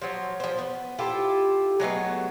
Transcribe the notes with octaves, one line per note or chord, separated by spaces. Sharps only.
F3 F#3
F3 C5
B3
E4 F4 G4 A4
F#3 G#3 A3 B3